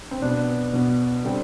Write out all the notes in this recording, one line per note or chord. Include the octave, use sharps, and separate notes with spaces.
C4
B2 B3 D4
B2 B3
D3 G3 C4